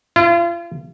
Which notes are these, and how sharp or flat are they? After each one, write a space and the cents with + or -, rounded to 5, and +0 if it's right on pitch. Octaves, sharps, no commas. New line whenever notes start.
F4 -40